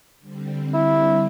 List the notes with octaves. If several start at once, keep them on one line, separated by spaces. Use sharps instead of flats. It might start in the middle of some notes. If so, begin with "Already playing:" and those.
D3 G3 C4
E4